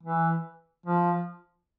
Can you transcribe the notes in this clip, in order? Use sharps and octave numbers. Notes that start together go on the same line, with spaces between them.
E3
F3